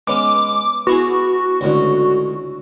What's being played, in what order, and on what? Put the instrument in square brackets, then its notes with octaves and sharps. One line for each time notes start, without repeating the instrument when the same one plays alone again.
[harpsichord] G#3 B3 C#4 [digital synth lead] D6
[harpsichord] B3 E4 G#4 [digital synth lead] F#4
[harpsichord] C#2 A2 D3